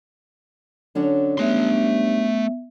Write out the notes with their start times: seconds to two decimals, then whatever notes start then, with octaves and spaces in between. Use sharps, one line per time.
0.95 D3 F#3 C#4 D4
1.38 G2 A3 B3 E5 C6